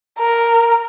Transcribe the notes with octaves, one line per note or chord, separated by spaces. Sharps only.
A#4